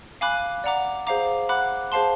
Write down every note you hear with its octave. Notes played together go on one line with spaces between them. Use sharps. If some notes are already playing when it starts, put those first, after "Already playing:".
F5 G#5 B5 D6 F#6
D5 F#5 A#5 D6
G#4 C5 F5 A#5 D6
F#5 B5 D6 F#6
G#4 C5 F5 A5 C6